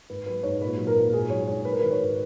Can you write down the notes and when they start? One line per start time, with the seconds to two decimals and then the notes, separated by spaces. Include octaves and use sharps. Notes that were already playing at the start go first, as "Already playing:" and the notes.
0.10 G#2 B4
0.26 F#3 B4
0.43 G#2 C#5
0.61 A#2 B4
0.78 F#3
0.87 A#4
0.96 A#2
1.13 G#2 G#4
1.30 F#3 C#5
1.47 G#2 C#5
1.64 F#3 B4
1.72 A#4
1.80 D#3 B4
1.91 C#5
2.00 G#2